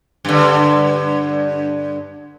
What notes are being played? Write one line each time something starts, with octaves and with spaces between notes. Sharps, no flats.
G2 D3